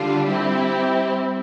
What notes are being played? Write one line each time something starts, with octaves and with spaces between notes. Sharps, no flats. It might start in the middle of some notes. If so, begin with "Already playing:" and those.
Already playing: D3 G3 D4 F4
G3 C4 E4 G4